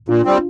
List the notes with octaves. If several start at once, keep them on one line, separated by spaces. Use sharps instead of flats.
A#2 D4 F4
G3 C4